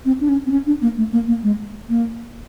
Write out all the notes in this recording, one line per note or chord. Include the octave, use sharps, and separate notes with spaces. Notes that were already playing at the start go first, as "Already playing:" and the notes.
C4
D4
C#4
C4
C#4
D4
A#3
A3
A#3
A#3
G#3
A#3